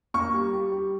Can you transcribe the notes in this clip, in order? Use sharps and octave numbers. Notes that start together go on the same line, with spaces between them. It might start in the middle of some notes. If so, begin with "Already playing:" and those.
A#3 C#6
G3
G3
G3